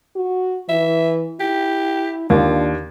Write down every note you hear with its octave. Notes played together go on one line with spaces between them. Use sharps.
F#4
E3 E5
E4 G4
D#2 D4 F4